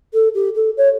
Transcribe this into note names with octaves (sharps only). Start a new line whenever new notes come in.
A4
G4
A4
C#5